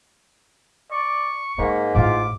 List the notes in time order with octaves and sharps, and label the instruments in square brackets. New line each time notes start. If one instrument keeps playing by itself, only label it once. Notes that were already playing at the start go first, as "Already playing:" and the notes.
[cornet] D5 [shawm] C#6
[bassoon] G#2 [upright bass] G#3 [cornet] A#3
[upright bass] A1 A2 [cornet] F4 [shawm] D6